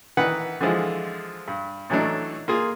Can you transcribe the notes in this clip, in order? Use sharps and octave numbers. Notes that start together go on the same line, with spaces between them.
D#3 E3 B4 F#5
D3 E3 F3 G#3
G2
A2 E3 F#3 A3 D4 D#4
A#3 F4 G#4